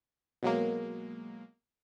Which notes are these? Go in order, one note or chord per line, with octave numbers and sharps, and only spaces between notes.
B2 F#3 G#3 A#3